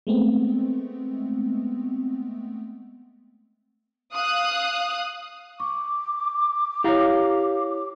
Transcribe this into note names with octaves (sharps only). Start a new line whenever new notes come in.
G#3 A3 B3 C4
F5 D#6 F#6
C#6 D6
E4 G4 C#5 F5 A#5